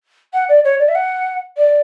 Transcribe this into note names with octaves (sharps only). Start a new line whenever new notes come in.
F#5
D5
C#5
D5
E5
F#5
D5